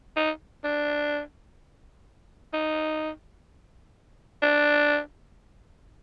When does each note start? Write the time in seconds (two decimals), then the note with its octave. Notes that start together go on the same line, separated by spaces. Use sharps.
0.16 D#4
0.64 D4
2.53 D#4
4.42 D4